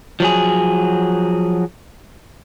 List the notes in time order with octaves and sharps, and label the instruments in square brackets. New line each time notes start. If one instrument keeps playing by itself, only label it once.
[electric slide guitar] F3 F#3 G#4